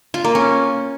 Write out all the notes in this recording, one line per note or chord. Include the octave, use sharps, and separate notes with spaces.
F4
A#3
C#4